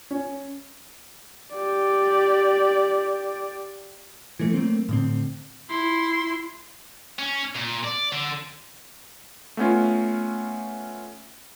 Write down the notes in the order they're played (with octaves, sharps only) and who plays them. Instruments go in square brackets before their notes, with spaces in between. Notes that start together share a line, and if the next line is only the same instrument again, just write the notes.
[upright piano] C#4
[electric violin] G4 D5
[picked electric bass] E3 F3 A3
F#3 A3 A#3 C4
A2 D3 C4
[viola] E4 C6
[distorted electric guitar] C#4
A#2
D5
D3
[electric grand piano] A3 B3 C#4 F4